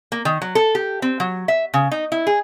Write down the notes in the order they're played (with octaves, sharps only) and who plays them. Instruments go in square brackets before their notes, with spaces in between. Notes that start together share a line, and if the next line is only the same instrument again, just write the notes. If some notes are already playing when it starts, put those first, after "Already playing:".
[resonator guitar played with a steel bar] A#3
D#3
F#3
A4
G4
C4
F#3
E5
C#3
D#4
E4
G#4